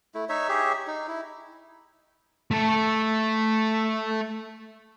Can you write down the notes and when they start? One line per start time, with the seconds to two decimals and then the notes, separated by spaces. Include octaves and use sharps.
0.14 A3 E4
0.29 D#4 C#5 E5
0.49 G4 G#4 C#5 E5
0.87 D#4
1.08 E4
2.51 A3 A4